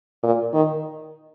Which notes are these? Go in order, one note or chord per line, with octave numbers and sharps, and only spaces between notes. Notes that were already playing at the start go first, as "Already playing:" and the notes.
A#2
D#3